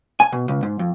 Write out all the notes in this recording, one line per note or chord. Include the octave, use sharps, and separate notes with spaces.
G#5
B2
C#2
G#2
F2